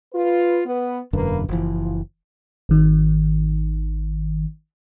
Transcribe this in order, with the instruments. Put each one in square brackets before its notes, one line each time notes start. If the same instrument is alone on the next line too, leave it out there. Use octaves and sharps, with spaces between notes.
[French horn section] F4 B4
B3 B4
[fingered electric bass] E1 F#2 D3 [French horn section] A#3 B4
[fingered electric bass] F#1 E3 [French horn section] F3
[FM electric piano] G#1 D#3